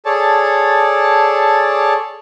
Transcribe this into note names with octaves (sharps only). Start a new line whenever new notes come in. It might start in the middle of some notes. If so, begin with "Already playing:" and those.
G#4 A4 C#5 D5 A5